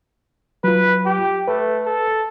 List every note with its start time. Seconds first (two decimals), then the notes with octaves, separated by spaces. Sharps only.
0.64 F#3 F4 B4
1.06 G4
1.48 A3 B4
1.86 A4